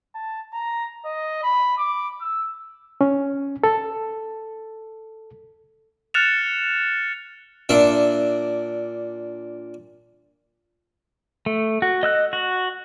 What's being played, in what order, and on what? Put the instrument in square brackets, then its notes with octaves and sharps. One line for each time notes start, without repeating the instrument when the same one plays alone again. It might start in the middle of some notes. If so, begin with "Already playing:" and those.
[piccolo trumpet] A5
A#5
D#5
B5
D6
E6
[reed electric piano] C#4
A4
[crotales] F6 F#6 A6 C#7 E7 F7
[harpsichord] A#2 D4 E5
[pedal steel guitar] A3
F#4
D#5 E6 F#6
F#4